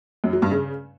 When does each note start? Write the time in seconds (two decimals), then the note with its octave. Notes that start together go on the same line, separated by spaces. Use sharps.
0.24 F#2
0.33 F#3
0.42 G2
0.51 C#3